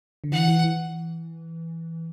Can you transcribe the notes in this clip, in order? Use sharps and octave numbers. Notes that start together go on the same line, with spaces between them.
D3
E3 F#5
E3
E3